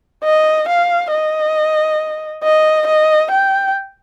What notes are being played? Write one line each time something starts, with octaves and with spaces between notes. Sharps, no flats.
D#5
F5
D#5
D#5
D#5
G5